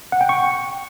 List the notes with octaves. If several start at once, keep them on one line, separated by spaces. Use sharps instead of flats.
F#5
G5
C#6